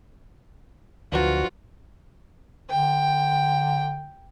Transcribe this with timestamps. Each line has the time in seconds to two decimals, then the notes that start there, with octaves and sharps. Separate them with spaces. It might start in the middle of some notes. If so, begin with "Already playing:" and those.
1.12 D2 G2 F3 F#3 F4 F#4
2.70 D3 G5